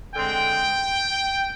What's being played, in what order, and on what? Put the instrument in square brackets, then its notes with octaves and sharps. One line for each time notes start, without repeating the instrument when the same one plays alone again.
[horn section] D3 G#3 C4 G5